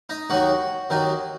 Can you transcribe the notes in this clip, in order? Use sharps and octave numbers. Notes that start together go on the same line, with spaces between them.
D#4 D#5
D#2 D#3 F#3 D#4 F#4 F#5
D#2 D#3 F#3 D#4